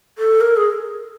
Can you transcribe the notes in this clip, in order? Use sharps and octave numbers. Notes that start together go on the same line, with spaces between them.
A4
A#4
G#4